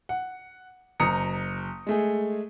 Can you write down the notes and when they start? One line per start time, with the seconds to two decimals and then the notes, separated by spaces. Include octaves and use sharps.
0.09 F#5
1.00 F#1 A#5 D#6 C#7
1.87 G#3 A3 G#4